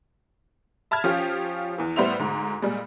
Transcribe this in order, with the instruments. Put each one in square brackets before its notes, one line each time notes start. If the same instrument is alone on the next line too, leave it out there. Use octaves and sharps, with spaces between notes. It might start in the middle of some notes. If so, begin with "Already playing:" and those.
[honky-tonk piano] E5 A5 B5 F6 G#6
F3 C#4 F4 G4
E2 E3
A2 G3 B3 C5 E5 F7
D2 G#2
A#2 G3 G#3